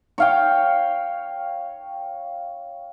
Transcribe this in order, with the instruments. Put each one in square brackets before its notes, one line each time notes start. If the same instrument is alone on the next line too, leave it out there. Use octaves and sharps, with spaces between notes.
[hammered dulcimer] C#5 F5 G5